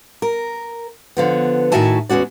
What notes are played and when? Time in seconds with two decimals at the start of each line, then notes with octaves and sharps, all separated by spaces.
0.22 A#4
1.17 D3 F3 B3
1.72 A2 D#3 F#4 E5 G#5 A5
2.09 E2 G#3 C#4 F#4 D5